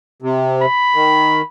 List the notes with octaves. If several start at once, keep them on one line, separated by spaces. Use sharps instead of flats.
C3
B5
D#3